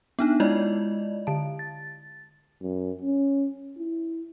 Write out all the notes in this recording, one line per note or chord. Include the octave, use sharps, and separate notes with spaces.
B3 D4 D#4
G#3 E4 F4 D5 D#5
D3 A5
A6
F#2
C#4
E4